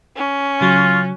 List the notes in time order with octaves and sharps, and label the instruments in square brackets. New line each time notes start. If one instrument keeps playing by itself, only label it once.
[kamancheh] C#4
[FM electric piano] C#3 F#3 [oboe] F4